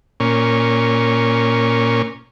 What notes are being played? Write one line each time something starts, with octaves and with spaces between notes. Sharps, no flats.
A#2 C#4